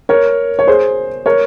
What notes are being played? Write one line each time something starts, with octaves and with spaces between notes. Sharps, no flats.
A#4 C#5
C#5
G#4 C5
A#4 C#5